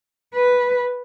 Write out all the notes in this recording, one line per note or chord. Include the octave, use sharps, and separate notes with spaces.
B4